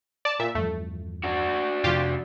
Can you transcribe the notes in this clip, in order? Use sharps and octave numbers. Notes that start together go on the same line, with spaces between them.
D5 A5
A#2 E5
E2 G2 F3 A3
D4 F#4
F2 C3 F3 F4 G4